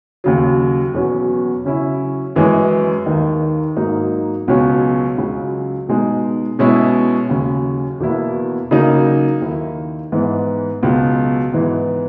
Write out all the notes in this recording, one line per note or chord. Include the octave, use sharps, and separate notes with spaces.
D#2 C#3 F#3
E2 B2 F#3 C#4
C#3 F#3 C#4 E4
F#2 E3 G#3 C#4
D#2 D#3 A#3 D#4
G#2 F#3 A#3 D#4
C#2 B2 F#3 C#4
C#2 C#3 F#3
B2 G#3 D#4
B2 G#3 C#4 E4
D#2 C#3 F#3 C#4
E2 B2 A#3 E4
C#3 F#3 A#3 D#4
D#2 D#3 A#3 E4
G#2 E3 B3
C#2 B2 F#3
G#2 E3 B3